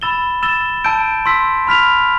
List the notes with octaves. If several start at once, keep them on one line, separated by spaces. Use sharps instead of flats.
B5 E6 A6 E7 G7
E6 A6 E7 G7
A5 E6 G6 D7
C6 E6 B6
B5 F6 B6 F7